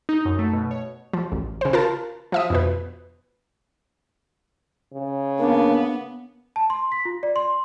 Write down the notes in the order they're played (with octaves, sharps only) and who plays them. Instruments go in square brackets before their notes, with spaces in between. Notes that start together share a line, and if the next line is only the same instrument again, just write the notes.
[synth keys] D#4
F#2
A3
B2
C#5
[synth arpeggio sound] F3
A1
C#3 C5
F4 A#4 A5
F3 E5 D#6
F2 B2 B4
[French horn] C#3
[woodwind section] A#3 D4 [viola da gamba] B3
[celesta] A5
C6
B6
F4
D5
C6